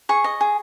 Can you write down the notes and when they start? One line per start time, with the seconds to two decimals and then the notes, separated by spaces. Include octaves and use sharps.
0.09 G#4 C#6
0.24 D#5
0.41 G#4